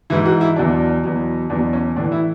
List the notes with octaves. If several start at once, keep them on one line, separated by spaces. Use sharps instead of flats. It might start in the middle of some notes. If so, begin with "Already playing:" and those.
G#2 E3 E4
F#4
E4
E2 B2 F#3 D4
E2 B2 F#3
E2 B2 F#3 D4
C#4
A2 E3 D4
E4